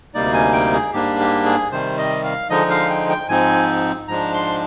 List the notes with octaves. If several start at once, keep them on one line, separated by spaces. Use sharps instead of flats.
D2 C3 G3 A#3 D#4 D5
G#5
G5
G#4
G#2 G3 A#3 D4 G4
G4
G#4
C3 D#3 G3 C5
D#5
F5
D3 F3 G#3 D#4 D#5
F5
G5
G5
G#2 F3 C4 D#4 G#5
G#2 F3 G#3 D4 A#5
C6